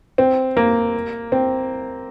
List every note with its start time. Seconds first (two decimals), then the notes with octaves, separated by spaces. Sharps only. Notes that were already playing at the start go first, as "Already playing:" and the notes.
0.18 C4
0.57 A#3
1.32 C4